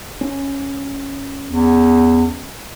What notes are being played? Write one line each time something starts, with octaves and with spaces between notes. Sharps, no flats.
C#4
E2